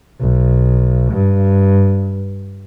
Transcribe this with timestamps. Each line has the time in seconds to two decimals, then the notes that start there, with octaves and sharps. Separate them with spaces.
0.20 B1
1.13 G2